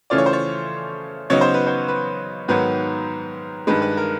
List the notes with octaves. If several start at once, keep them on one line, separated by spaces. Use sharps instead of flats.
C#3 E3 A3 C#4 F4 D5
C#5
C5
C#5
C#3 F#3 B3 D#4 C#5
C5
B4
C5
B4
G#2 D#3 F#3 B3 B4
G2 D#3 G#3 B4
B4
A#4